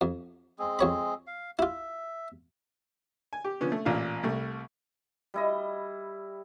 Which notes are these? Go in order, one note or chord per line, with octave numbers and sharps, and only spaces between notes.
F2
G#3 C4 G#4
F2 C#5 B5
F5
E4 F4 E5
G#5
G4
D3 F3 B3 C#4
A3
A1 A#2 F5
C2 G3 A3
G3 E4 D#5